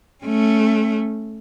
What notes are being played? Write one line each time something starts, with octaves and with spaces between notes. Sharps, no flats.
A3 C#4